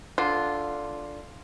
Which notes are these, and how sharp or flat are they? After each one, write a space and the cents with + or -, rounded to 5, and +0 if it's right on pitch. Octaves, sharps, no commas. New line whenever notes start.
D3 -5 F4 +0